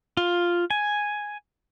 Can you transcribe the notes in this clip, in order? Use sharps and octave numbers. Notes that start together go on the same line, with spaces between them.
F4
G#5